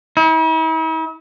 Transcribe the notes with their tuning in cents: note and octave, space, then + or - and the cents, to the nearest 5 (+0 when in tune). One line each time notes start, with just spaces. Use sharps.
E4 -45